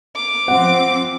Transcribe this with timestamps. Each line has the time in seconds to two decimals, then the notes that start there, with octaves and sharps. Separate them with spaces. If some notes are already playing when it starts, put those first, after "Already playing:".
0.16 D6
0.48 F3 C4 F#5